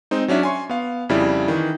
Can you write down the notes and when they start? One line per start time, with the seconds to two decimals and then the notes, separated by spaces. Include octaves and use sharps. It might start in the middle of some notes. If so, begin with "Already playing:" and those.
0.11 G#3 C4 D#4
0.28 F#3 C#4 D4 E5
0.43 G#5 C6 C#6
0.69 B3 F5
1.09 F2 C#3 G3 E4 D5
1.48 D#3 E3